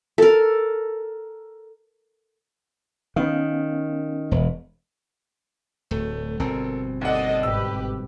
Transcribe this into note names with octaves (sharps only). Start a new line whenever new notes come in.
A4 A#4
D#3 B3 C#4 F5
E1
D1 A3
G1 B2 C4 A4 A#4
D#2 A4 D5 D#5 F#5
G#1 G4 B4 E6